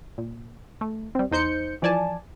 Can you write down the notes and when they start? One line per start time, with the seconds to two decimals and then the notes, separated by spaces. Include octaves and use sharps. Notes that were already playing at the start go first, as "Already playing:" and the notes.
0.18 A#2
0.81 A3
1.15 G3 C4
1.31 E2 D#4 C5 G6 C#7
1.82 E3 F3 D5 G#5 A5